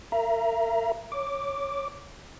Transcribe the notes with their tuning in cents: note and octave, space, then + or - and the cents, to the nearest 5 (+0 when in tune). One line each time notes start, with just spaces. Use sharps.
A#4 -30 E5 +40 A#5 +15
C#5 +0 D6 +0